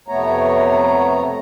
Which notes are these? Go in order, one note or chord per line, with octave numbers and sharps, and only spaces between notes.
F2 C3 A3 B3 C#5 A#5